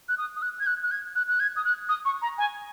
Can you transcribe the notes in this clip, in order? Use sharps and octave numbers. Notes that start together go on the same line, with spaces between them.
F#6
D#6
D#6
F#6
G#6
F#6
F#6
G#6
F#6
F#6
G#6
D#6
F#6
D#6
C#6
A#5
G#5